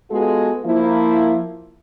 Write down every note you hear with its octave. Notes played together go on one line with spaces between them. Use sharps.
G#3 B3 F4 F#4 G#4 A4
F3 A#3 E4